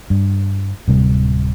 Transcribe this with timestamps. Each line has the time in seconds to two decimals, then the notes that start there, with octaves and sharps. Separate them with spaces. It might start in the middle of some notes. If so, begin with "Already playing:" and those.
0.10 G2
0.87 D1 C3 G3